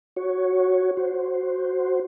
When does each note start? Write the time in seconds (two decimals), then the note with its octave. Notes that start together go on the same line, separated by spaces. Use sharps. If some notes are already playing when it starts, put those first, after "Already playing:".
0.16 F#4 C#5
0.97 F#4 C5